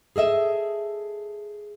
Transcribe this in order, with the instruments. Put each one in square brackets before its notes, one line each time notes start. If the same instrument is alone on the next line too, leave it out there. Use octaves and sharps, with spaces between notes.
[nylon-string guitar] G#4 A4 D#5 E5